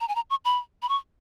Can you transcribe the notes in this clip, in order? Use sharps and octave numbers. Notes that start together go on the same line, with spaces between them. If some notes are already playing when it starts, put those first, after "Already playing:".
A#5
G#5
A#5
C#6
B5
B5
C#6